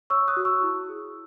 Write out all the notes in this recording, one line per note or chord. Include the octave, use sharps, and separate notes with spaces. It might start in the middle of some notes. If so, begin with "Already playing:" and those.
C#5 C#6 E6
D#6 F#6
F#4
C#6 E6
E4
G#4